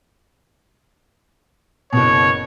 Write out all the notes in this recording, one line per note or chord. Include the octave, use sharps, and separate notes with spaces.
F#1 B2 C#5